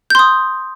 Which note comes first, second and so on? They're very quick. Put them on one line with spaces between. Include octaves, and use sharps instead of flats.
G6 C6 D#6